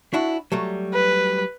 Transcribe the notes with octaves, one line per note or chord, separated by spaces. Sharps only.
D4 E4 F#4
F#3 G3 A3
B4